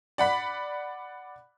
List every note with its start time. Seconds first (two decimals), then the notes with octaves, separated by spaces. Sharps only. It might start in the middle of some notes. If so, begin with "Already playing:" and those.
0.18 D5 F#5 B5 B6